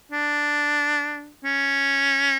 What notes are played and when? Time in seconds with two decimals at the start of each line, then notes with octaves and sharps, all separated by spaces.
0.12 D4
1.44 C#4